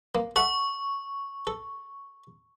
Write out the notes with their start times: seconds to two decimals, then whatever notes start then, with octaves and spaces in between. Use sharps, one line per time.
0.15 A#3
0.36 A4 E5 F#5 C#6
1.47 A4